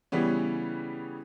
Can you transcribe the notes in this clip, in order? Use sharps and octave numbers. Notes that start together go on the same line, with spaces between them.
C#3 E3 G3 B3 C#4